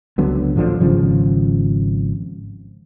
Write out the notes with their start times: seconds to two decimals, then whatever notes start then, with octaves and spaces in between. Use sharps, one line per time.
0.18 C#2 D3 F#3 B3
0.56 A1 D3 F3 D4
0.80 G#1 C#3 F3